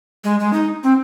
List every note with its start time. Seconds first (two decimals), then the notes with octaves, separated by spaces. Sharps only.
0.24 G#3
0.40 G#3
0.53 D#4
0.83 C4